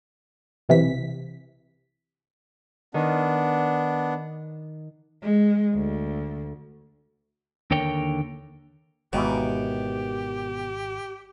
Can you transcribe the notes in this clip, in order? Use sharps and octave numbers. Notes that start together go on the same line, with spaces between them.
B1 C3 E3 B6
D#3 B3 D4
G#3
D2
D#2 D3 A#4 C#5 G5
G#1 D#2 B2 D#3 E3 G#3 G4